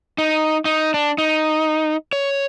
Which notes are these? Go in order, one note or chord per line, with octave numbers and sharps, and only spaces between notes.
D#4
D#4
D4
D#4
C#5